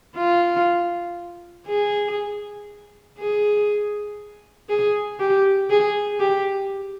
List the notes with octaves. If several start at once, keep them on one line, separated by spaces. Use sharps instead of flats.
F4
G#4
G#4
G#4
G4
G#4
G4